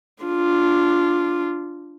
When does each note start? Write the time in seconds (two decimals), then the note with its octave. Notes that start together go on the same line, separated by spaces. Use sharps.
0.23 D4 F4